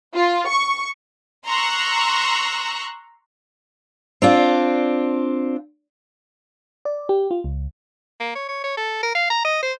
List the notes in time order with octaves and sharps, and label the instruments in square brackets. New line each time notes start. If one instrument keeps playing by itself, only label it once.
[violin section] F4
C#6
A#5 C6 C#6 E6 F#6
[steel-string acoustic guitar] C4 D4 F4
[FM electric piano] D5
G4
F4
C#2
[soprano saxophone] A#3
C#5
C#5
C#5
A4
A#4
F5
A#5
D#5
C5